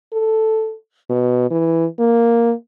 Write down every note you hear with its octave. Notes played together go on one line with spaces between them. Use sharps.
A4
B2
E3
A#3